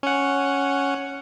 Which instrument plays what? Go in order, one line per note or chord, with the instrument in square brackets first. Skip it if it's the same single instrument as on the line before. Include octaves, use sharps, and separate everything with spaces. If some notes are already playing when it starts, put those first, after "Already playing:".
[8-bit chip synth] C#4 F#5